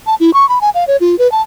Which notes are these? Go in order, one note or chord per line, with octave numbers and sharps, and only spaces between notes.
A5
E4
C#6
B5
G#5
F5
C#5
F4
B4
A5